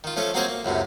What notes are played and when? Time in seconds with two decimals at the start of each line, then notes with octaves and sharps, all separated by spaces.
0.04 D#3 F4
0.16 F3 A3 C#4 A4
0.34 F#3 A#3 C4 G#4 C5 C#5
0.48 A#3
0.65 C#2 F#2 A2 C3